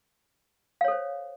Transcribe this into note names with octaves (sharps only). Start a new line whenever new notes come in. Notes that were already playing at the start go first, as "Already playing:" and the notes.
A4 C5 C#5 F5